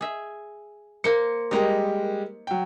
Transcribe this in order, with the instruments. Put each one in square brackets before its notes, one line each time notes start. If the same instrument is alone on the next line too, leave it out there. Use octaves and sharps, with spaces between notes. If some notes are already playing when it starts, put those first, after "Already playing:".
[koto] G#4 E5
[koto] A#3 C5 [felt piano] C#7
[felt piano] G3 G#3 G4 [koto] D#4 A#4
[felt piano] F#3 G5